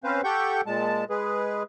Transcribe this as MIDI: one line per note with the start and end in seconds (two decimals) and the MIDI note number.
0.04 0.21 60
0.04 0.21 61
0.04 0.21 71
0.04 0.21 72
0.04 0.21 77
0.24 0.61 67
0.24 0.61 69
0.24 0.61 78
0.24 0.61 79
0.24 0.61 85
0.24 0.61 91
0.66 1.04 46
0.66 1.04 56
0.66 1.04 81
1.10 1.63 56
1.10 1.63 68
1.10 1.63 71